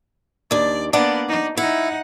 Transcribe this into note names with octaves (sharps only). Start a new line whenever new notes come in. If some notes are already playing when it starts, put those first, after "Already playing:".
D#2 D4 D5
A#3 B3 D4 D5 F#5
D#4
D#4 E4 F#5